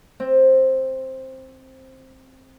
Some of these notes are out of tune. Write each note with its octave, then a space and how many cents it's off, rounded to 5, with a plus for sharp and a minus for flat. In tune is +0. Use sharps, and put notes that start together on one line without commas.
C4 +10